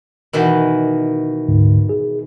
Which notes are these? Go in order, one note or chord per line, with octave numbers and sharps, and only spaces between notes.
B2 D#3 E3
D2 G#2 D3
G#4